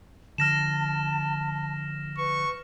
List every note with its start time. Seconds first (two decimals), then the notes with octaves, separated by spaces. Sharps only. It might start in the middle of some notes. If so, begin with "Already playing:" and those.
0.38 D3 F3 A5 F6 A#6 E7
2.18 B4 C#6